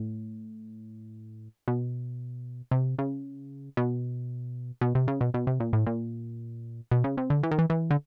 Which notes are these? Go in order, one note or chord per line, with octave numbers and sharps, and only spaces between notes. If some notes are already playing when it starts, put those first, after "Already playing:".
Already playing: A2
B2
C3
C#3
B2
B2
C3
C#3
B2
B2
C3
A#2
A2
A#2
B2
C#3
C3
D3
E3
D#3
E3
E3
D3